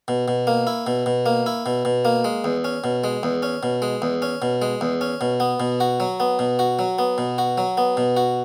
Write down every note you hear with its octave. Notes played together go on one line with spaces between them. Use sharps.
B2
B2
A#3
E4
B2
B2
A#3
E4
B2
B2
A#3
G#3
E2
C#4
B2
G#3
E2
C#4
B2
G#3
E2
C#4
B2
G#3
E2
C#4
B2
B3
B2
F#4
F#3
B3
B2
F#4
F#3
B3
B2
F#4
F#3
B3
B2
F#4